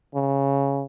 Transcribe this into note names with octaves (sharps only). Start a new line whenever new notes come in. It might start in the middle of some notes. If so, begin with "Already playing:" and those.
C#3